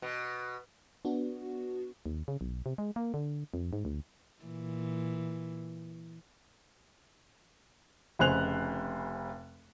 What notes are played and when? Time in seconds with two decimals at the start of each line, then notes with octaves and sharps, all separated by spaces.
0.02 B2
1.05 B3 D4 F#4
2.06 D#2
2.28 C#3
2.41 B1
2.66 C3
2.78 G#3
2.96 A#3
3.14 D3
3.54 F2
3.73 G#2
3.85 D2
4.44 A#2 E3
8.19 F1 C#3 C5 G#5 F#6 F7